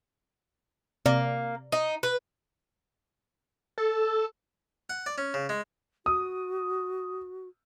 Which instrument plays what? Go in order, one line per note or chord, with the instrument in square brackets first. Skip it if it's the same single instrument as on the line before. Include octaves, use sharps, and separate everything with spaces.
[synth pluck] C3 D5 A#5 [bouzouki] A#3
[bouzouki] D#4
B4
[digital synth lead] A4
[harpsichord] F#5
D5
C#4
C#3
G#3
[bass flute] F#4 [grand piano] D#6